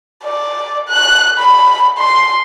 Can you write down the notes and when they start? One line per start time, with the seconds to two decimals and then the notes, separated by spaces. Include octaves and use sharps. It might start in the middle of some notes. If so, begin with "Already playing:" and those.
0.24 D5
0.89 F#6
1.39 B5
1.98 C6